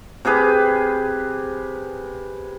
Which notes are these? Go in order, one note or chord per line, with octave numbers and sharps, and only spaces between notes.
C3 G4 G#4 B4